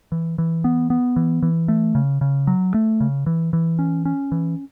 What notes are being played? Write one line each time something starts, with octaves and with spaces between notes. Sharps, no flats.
E3
E3
B3
B3
E3
E3
A3
C#3
C#3
F#3
A3
C#3
E3
E3
C#4
C#4
E3